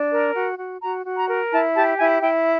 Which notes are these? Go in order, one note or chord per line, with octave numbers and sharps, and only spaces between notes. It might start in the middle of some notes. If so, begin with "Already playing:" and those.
Already playing: D4
A#4
F#4
F#4
F#4 A#5
F#4
A#5
A#4
E4 A5
G4 A5
E4 G#5
E4 G5